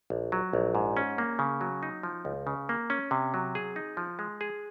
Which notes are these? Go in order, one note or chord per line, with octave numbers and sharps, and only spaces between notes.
A#1
F#3
A#1
G#2
C#4
A#3
C#3
F#3
D#4
F3
C#2
C#3
A#3
C#4
C3
F#3
G#4
D#4
F3
G#3
G#4